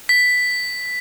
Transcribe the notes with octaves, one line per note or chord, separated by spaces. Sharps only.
B6